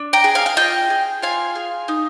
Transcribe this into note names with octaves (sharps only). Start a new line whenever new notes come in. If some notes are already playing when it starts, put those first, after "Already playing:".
Already playing: D4
G5 A#5
G#4
F5 G#5
F5
F4 D#5 G5
G#4
F4 F5 G#5
G#4
D#4